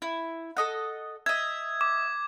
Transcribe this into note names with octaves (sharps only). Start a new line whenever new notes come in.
E4
A4 D#5 F#5
D#5 E5 G#6
D6